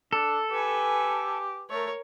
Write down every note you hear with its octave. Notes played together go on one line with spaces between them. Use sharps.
D4 A4
G4 B4 G#5
A3 A#4 C#5